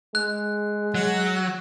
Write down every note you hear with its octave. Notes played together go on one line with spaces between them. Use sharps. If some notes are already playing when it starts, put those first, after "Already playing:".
G#3 F#6
F#3 F#5